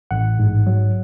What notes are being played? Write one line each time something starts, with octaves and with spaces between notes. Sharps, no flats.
A1 F#5
G#2
F#3